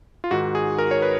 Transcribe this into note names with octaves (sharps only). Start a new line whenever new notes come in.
F4
G#2 D#3 F#4
G#4
A#4
C#5
B4